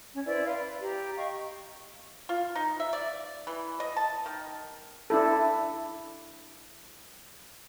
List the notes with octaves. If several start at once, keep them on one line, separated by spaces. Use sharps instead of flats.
C#4
E4 B4 C5 D5
B4 F5 C6
B5
G4 A#5
D#5 F5 G5 C#6
F4
D#4
E5
D5
E3
D#5
A5
D#3
D4 E4 A4